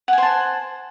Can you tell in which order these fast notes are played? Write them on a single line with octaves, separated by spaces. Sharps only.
F#5 G#5 C5 A5